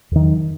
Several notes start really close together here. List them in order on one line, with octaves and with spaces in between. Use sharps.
E2 D#3 F#3